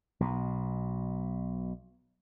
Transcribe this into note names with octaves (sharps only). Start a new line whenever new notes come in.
B1 B2